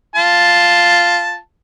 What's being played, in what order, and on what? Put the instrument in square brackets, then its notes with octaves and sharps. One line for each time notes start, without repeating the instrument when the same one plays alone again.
[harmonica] F4 A5